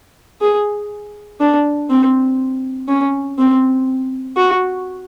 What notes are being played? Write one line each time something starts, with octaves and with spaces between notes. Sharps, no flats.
G#4
D4
C4
C#4
C4
F#4